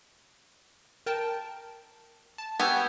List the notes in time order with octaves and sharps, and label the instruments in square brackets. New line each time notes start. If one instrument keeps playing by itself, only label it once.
[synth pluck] A#4 G5 A5
A5
[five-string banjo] B3 [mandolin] G4 G#5 [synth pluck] C#6 E6 G6